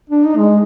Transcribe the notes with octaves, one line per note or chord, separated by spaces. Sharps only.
D4
D#4
G#3